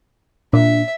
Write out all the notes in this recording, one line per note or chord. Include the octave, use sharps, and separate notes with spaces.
A#2 D4 E5